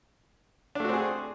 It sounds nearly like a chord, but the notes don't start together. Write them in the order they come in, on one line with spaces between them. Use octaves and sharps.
D4 A3 F#4 C4 G#4